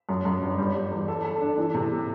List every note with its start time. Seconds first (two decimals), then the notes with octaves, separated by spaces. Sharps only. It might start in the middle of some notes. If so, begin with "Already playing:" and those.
0.09 F#2
0.25 F#2
0.41 G1
0.58 G3
0.74 G3
0.92 E2
1.08 A4
1.24 A4
1.41 D4
1.57 E3
1.74 C3